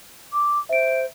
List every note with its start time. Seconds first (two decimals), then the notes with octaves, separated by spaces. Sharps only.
0.33 D6
0.69 C5 E5 D7